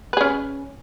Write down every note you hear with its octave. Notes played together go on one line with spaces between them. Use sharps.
C#4 G#4 B4